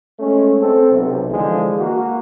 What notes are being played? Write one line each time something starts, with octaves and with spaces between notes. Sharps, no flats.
G#3 A3 C#4
C4 A4
B1 C3
D3 E3 F3 G#3
A#3 F#4